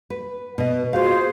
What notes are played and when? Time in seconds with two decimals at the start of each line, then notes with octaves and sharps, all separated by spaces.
0.10 B4
0.58 B2 D#5
0.93 F4 F#4 G#4 C5 F5